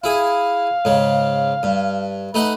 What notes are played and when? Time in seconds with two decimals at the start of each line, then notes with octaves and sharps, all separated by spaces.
0.04 E4 G#4 F5
0.85 G#2 C#3
1.63 G2
2.34 A3 D#4 B4 F#5